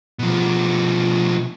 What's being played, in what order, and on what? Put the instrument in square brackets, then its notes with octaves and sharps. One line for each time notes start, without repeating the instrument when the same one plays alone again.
[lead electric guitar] B2 F3